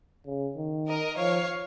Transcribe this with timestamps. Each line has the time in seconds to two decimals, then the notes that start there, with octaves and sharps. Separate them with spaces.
0.25 C#3
0.56 D#3
0.86 A#4 D#5
1.17 F3 C#5 F5